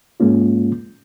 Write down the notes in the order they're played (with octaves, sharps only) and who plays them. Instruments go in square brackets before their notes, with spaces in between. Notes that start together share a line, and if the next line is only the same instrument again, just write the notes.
[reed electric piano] G#2 G#3 A#3 C#4 F4